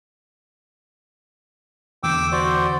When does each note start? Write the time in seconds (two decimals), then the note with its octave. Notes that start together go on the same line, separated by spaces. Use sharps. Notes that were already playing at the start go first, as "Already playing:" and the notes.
2.03 E2 D3 G5 D6 E6
2.32 F#4 C5 D5